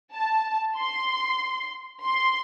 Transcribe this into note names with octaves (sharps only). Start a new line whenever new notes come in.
A5
C6
C6